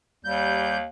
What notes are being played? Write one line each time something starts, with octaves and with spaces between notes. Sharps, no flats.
D#2 G3 G6